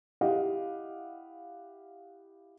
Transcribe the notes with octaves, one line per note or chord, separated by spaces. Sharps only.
E4 G4 D#5 F5 F#5